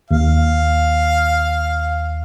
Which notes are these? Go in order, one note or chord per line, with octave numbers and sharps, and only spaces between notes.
D#2 F5